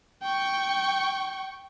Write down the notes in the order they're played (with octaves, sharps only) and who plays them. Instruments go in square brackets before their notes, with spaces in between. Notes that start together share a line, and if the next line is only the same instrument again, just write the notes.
[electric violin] G5 C#6